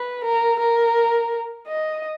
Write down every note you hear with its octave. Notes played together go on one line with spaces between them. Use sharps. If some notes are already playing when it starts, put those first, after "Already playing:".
Already playing: B4
A#4
A#4
D#5